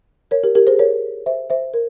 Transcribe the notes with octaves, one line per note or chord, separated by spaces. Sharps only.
A#4 C#5
G4 A#4
G4 A#4
G#4 C5
A#4 C#5
C5 E5
C5 E5
A#4